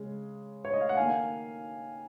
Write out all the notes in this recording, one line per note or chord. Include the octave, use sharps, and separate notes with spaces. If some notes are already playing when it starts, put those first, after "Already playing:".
Already playing: C#3 G#3
C#5
D#5
F5
F#5
D#3 A#3 F5 G#5